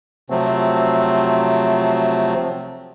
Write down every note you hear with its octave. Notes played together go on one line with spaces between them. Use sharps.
C3 F3 F#3 A3 C4